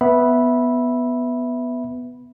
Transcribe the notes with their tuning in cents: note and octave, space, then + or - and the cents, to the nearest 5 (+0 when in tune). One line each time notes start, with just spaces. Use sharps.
B3 +0 E5 +0 B5 -10